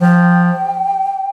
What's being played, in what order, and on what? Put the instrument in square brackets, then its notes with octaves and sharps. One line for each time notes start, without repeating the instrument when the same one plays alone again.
[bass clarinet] F3 [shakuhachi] G5